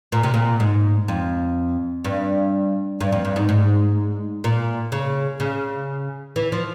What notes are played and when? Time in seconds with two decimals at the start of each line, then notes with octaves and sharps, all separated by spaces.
0.12 A#2
0.23 C3
0.34 A#2
0.60 G#2
1.08 F2
2.05 G2
3.01 G2
3.12 F2
3.25 G2
3.36 G#2
3.49 G#2
4.44 A#2
4.92 C#3
5.40 C#3
6.36 E3
6.52 F3